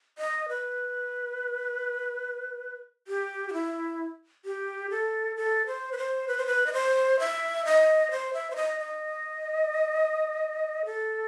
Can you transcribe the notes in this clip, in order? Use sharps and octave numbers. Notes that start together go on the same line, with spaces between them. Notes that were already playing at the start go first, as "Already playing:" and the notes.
D#5
B4
G4
F#4
E4
G4
A4
A4
C5
B4
C5
B4
C5
B4
D#5
C5
E5
D#5
C5
E5
C5
D#5
D#5
A4